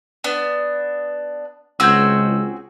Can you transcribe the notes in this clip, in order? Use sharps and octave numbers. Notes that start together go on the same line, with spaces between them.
B3 D4
C#2 C4 F#4 G#4 E6 G6